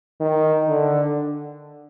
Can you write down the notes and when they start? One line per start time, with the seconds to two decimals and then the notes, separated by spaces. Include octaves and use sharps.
0.20 D#3
0.68 D3